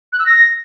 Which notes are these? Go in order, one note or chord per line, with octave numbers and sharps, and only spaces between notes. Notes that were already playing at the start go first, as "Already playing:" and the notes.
F#6
E6
A#6